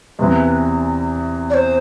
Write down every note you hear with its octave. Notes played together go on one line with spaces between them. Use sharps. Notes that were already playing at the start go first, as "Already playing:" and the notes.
E2 C3 E3 B4
D5
C5